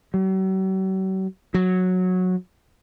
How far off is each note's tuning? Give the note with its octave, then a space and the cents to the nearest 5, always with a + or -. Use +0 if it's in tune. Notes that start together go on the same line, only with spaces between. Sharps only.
F#3 +45
F#3 -10